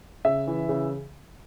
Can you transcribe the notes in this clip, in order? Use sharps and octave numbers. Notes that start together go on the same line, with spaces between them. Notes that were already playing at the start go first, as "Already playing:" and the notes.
C#3 E5
E3
C#3